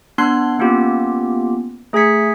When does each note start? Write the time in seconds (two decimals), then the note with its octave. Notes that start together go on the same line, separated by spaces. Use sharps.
0.18 B3 D4 C6 F#6 C7
0.59 A#3 B3 C#4 F4 G4
1.93 A3 G#4 G#5 G#6 B6 C#7